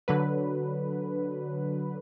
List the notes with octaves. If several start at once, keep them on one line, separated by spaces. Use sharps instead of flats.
D3 F#3 B4